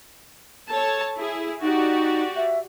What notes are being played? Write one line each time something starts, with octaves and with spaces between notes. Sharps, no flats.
A4 C#5 A5
E4 G#4
D#4 F#4 G4 D5
E5